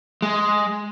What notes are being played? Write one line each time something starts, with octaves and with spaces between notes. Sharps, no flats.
G#3